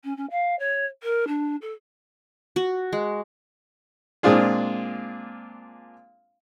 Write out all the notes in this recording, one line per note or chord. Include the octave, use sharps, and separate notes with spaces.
C#4
C#4
F5
C#5
A#4
D4
A4
F#4
G#3
A#2 G#3 C4 D4 F4 G#4